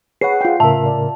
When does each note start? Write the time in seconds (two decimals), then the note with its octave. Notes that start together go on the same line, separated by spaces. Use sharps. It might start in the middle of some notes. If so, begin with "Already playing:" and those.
0.21 G#4 B4 C#5 F#5 C7
0.41 F4 G5
0.60 A2 C#3 A#4 E5 A5
0.86 D5